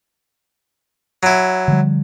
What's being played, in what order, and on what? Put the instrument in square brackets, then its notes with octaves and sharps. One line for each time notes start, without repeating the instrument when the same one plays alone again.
[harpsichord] F#3 E4
[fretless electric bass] D3 F3 G3